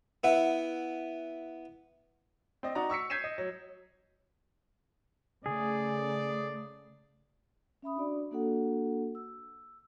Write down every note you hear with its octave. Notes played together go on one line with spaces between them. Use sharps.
B3 E4 E5 F#5
C4 D5 D#5
D#4 F#4 D5 D#5 A#5
C#6 E6 B6 C#7
G6 G#6 B6 C7 D#7 E7
D#5
F#3
C#3 A3 G#4 D5
C#4 E5 B5 D#6
D4 F#4 D5
A#3 D4 F#4 A4 F#5
E6